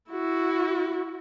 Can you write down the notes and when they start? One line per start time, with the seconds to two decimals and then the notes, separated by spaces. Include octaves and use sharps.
0.10 E4 F#4